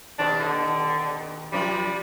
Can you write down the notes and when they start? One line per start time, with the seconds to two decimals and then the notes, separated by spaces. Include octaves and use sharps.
0.19 D#2 B2 C4 D4
0.40 D3
1.52 F#2 C3 F3 G3